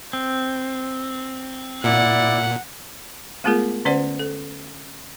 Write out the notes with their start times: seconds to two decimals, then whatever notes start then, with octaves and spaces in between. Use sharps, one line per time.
0.13 C4
1.84 A#2 E4 D5 F#5
3.44 G#3 A3 B3 F4 G#4 A#4
3.85 D3 C#4 B4 C5 D5 F#5
4.19 A4